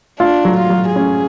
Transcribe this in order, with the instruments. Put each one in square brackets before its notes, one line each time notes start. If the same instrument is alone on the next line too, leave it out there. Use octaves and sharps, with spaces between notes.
[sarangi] D4 [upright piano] F4
[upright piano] F#3
[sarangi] F4
[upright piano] F#3
[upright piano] C#4 [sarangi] G#4